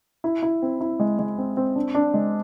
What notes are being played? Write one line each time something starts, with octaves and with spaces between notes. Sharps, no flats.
E4
E4
C4
E4
G#3
G#3
C4
C4
D4
D4
G#3